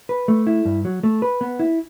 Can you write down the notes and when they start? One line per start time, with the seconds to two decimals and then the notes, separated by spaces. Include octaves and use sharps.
0.09 B4
0.28 A3
0.47 E4
0.65 G2
0.85 F#3
1.03 A3
1.22 B4
1.41 B3
1.60 E4